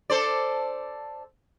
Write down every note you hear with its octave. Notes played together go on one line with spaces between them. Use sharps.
A4 C5 D5